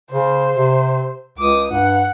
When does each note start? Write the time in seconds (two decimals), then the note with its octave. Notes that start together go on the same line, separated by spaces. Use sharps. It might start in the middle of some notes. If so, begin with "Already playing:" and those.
0.11 C#3 C5
0.54 C3
1.38 C#2 D6 D#6
1.71 G2 F#5